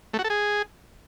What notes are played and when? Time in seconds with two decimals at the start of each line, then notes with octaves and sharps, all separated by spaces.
0.14 A3
0.19 F#4
0.24 A4
0.30 G#4